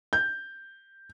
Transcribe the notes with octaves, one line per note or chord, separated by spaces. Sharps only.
G6